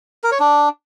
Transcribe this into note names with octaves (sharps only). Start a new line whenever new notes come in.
A#4
C#5
D4